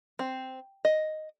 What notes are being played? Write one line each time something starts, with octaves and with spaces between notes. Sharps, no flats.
C4
D#5